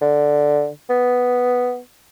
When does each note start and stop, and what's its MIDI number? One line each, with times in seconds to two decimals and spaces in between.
0.02 0.69 50
0.90 1.79 59